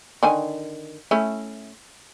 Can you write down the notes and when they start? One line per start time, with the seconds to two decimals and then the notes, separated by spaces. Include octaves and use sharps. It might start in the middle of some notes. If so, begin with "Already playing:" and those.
0.23 D3 D#3 G#5
1.11 A3 C#4 E4